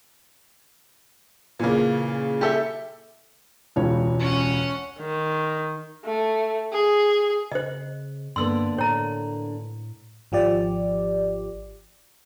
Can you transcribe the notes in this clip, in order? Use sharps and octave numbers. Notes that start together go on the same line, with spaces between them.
A#2 C#3 E3 A#3
G4 A4 E5
E1 C#2 C#5
C#4 F#5
D#3
A3
G#4
C#3 C5 D#5
G2 D3 A#3 B3 C6 E6
A2 C#5 A#5
G#1 F3 G4 D5